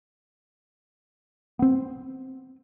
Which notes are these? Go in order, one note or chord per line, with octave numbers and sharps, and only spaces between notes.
B3 C4